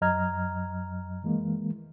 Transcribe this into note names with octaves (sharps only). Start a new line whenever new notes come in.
F#2 F#3 D#5 A#5 F6 G#6
E3 G#3 A#3